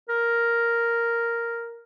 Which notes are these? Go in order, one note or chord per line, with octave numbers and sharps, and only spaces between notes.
A#4